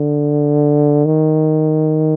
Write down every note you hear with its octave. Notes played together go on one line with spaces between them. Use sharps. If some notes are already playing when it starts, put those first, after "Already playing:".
Already playing: D3
D#3